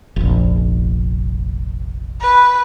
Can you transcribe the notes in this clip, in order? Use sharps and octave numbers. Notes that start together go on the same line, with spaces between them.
F1 A#1
B4